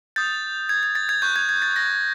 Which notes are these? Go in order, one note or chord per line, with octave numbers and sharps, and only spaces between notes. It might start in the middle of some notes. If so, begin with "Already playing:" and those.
D#6 G6 A6
G#6
G#6
A6
G#6
C#6 F#6 G6
G#6
G#6
A6
A#6